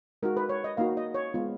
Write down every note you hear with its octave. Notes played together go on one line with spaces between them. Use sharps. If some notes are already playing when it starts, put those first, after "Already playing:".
G#3 D#4 F#4 A#4
B4
C#5
D#5
A#3 D#4 F#4 F5
D#5
C#5
G#3 B3 F4